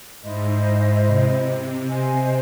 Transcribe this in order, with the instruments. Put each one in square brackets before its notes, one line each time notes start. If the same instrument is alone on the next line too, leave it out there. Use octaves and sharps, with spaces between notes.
[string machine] G#2 [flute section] E4 C5 D#5
[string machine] G#2
C3
[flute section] C5 D#5 G#5